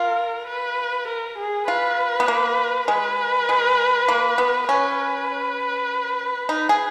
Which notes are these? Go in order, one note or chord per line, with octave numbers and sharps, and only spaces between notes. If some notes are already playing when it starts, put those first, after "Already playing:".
Already playing: F4 A#4
B4
A#4
G#4
F4 B4
B3
A#3
G#3 B4
G#3
A#3
B3
C#4 B4
D#4
G#4